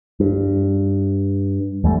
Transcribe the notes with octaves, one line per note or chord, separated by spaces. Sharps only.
G2
E2 G3 A3